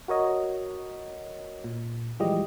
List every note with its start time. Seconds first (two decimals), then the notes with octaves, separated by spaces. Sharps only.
0.08 F#4 A#4 C#5 D#5
1.64 A#2
2.19 E3 F3 G3 G#3 G4 D#5